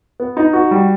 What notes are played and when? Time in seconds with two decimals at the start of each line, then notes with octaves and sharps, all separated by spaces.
0.20 B3
0.37 D#4
0.53 F#4
0.71 G3